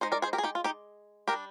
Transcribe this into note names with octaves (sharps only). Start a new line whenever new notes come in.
G#3 D#4 C5 D#5
A#4 D5
G#4 C5
G4 A#4
G#4
D#4 G4
F4
D#4 G4
D4 G4 A#4
G3